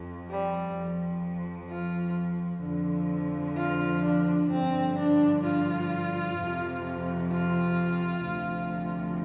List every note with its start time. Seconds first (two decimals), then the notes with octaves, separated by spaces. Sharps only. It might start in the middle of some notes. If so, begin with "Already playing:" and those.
Already playing: F2 F3
0.29 G3
0.76 F2 F3
1.70 F4
2.63 F2 D3 F3
3.57 F4
4.04 D4
4.51 G2 D3 F3 C4
4.97 D4
5.44 F4
6.37 F2 C3 F3
7.31 F4
8.25 D2 C3 F3